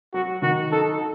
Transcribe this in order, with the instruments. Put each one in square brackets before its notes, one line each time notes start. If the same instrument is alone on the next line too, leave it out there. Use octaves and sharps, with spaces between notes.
[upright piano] F#3 [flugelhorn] F#4
[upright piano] D#3 [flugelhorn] F#4
[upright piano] D#4 [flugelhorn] A4